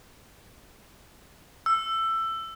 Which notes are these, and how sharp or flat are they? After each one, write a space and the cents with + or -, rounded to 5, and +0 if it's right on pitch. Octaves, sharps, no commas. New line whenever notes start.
E6 +15